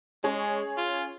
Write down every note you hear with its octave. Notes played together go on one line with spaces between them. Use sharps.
G#3 C#4 G#4 C#5
F4